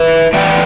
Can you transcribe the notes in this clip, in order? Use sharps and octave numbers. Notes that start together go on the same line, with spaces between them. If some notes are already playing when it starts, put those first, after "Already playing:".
Already playing: B4 E5
A2 E3 B3 D5 G5